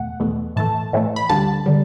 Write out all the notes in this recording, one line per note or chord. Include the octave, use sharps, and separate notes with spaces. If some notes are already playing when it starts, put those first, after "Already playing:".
Already playing: E2 B2 A3 F#5
E2 B2 A3
A2 E3 A3 A5
A2 E3 A3
B5
D2 D3 G3 A5
D3 G3